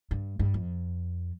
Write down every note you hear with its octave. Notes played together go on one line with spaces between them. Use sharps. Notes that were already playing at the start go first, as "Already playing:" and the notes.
G2
G2
F2